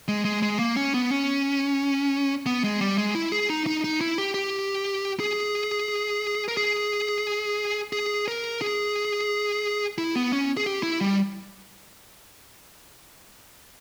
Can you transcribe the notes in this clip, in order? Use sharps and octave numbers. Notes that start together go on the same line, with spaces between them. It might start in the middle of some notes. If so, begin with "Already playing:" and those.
G#3
G#3
G#3
A#3
C#4
B3
C#4
B3
G#3
G3
G#3
E4
G#4
D#4
D#4
D#4
E4
G4
G4
G#4
A#4
G#4
G#4
A#4
G#4
E4
B3
C#4
G#4
G4
E4
G3